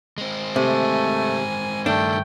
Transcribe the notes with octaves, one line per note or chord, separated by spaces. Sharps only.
G#3 C4
C3 A3 G#5
G2 D#3 A3 D4 G5